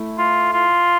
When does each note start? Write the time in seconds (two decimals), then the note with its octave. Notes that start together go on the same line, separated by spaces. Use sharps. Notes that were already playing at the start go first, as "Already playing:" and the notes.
Already playing: A3 E4
0.18 F4
0.53 F4